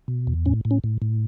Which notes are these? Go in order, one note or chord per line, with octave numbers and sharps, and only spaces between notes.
B2
E2
A2 C#4
A2
C#4
A2
A2